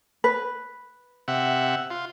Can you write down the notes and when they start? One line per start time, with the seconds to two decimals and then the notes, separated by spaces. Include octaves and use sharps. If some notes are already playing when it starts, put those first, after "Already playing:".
0.24 B4
1.28 C3 E5 F#5
1.91 F4